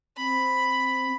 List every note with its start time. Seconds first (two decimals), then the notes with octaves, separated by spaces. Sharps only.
0.17 C4 B5